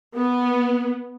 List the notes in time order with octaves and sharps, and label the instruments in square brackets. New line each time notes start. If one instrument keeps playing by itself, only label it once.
[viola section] B3